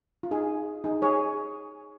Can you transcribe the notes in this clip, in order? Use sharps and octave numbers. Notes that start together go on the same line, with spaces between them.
F4
D#4 G#4
D#4 G#4
G#4 C#5